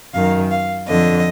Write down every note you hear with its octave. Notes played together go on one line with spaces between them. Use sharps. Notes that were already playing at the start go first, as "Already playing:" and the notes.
F#2 D#3 F5
F5
F2 D3 D#5